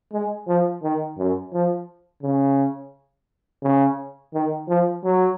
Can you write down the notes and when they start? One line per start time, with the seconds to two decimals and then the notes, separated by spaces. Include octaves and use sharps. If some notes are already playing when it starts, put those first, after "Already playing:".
0.13 G#3
0.47 F3
0.83 D#3
1.18 F#2
1.53 F3
2.23 C#3
3.63 C#3
4.34 D#3
4.68 F3
5.04 F#3